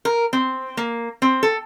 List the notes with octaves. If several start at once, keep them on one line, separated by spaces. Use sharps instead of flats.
A#4
C4
A#3
C4
A4